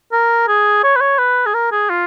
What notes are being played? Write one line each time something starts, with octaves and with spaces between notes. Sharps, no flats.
A#4
G#4
C#5
B4
C#5
B4
G#4
A#4
G#4
F4